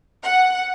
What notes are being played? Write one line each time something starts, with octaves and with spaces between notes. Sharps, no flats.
F#5